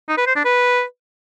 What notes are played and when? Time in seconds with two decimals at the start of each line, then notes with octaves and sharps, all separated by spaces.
0.08 D#4
0.17 B4
0.27 C5
0.36 D4
0.45 B4